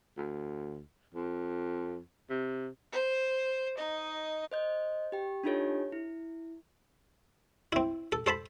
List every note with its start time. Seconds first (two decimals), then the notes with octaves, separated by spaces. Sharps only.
0.17 D2
1.14 F2
2.30 C3
2.93 C5
3.77 D#4 D#5
4.52 C5 D#5 G6
5.12 G4 G5
5.44 D4 D#4 F4 G4 A4 C#5
5.92 E4
7.72 C4 E4
8.12 A4
8.26 A4 C5 A5 B5